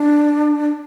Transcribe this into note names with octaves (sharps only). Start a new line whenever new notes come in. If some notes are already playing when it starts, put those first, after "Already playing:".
Already playing: D4